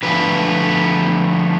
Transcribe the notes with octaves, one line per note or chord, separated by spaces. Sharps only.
D3 F3 A3 B4